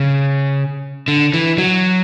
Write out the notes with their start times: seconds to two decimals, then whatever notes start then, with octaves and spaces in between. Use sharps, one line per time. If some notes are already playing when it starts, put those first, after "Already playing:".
Already playing: C#3
1.08 D3
1.34 E3
1.58 F#3